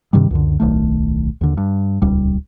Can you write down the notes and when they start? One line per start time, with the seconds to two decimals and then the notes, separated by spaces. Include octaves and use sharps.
0.13 G2 C3 D#3 G3
0.31 C#2 F#2 D3
0.60 D1 B1 D#3 A3
1.41 D#2 D3
1.57 G2
2.02 D#1 C#2 G3